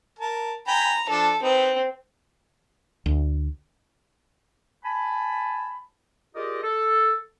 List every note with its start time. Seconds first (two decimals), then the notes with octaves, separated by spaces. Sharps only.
0.19 A#4 A5
0.67 G5 G#5 A#5 B5
1.09 F3 D4 A4 A5
1.43 C4 D#4 B4
3.06 D2
4.84 G#5 A5 B5
6.35 F4 G4 G#4 A#4 D5 D#5
6.63 A4